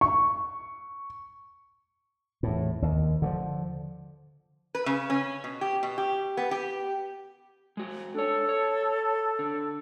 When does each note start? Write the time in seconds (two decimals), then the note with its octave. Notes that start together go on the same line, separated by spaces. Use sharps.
0.01 C#6
2.43 E2 A2
2.82 D#2
3.22 D3 E3 F3
4.75 B4
4.86 C#3
5.10 C#4
5.44 B2
5.61 G4
5.83 B2
5.98 G4
6.37 B3
6.51 G4
7.77 G#3 F#4
8.14 D4 A4 C#5
8.49 C#5
9.39 D3